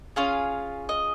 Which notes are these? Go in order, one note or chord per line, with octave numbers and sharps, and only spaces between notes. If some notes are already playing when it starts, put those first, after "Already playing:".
C#4 F4 G#4 F5
D#5